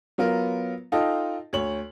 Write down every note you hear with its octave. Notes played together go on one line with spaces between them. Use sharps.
F#3 B3 F4 A#4
D#4 F4 A4 D#5 G5
D2 C#5 F#7